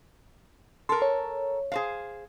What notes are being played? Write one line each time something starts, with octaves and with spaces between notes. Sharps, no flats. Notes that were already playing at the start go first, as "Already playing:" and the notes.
A4 A#4 C6
C#5
G#4 C5 F5